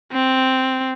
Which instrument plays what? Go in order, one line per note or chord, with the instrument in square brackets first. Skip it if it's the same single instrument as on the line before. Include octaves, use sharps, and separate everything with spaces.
[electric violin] C4